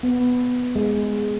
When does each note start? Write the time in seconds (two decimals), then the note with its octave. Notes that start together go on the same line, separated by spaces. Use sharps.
0.03 B3
0.76 G#3